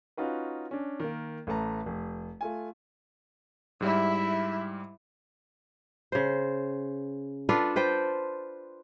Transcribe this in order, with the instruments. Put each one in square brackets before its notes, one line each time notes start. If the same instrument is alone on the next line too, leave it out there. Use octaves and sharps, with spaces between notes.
[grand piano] C#4 D#4 F4 F#4 B4
C#4 D4
D#3 A#3
A1 A3 B4 A5 A#5
F1
A3 F4 G#5
[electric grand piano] G#2 G3 [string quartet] E4 E5
[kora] C#3 C5
D4 F4 A4 B4
B4 C5 G5